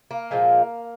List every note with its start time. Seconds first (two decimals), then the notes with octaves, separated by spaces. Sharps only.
0.11 A#3
0.31 A#2 F3 G#3